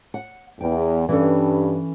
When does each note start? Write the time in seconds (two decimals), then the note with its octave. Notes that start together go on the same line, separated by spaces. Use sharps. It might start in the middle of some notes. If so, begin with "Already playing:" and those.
0.14 F#5
0.61 E2 G5
1.09 G2 E3 C#4 A4